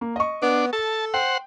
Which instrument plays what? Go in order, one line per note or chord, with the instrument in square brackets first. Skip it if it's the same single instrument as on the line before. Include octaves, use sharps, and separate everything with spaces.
[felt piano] A#3
D#5 C#6
[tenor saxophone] B3 [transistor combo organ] D4
[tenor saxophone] A4 [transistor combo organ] A5
[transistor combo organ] C5 F#5 [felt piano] G5